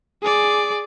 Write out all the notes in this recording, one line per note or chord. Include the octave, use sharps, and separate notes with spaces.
G#4 D5